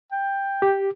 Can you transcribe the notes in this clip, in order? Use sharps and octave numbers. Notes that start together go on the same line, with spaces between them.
G5
G4